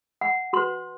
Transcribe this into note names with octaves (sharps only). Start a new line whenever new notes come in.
F#5
F#4 B4 C6